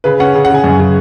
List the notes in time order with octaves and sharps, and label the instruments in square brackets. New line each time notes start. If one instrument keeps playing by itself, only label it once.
[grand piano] C#3 B4
C#4 F#5
C#3
F#5
C#3 G#5
F#2
C#3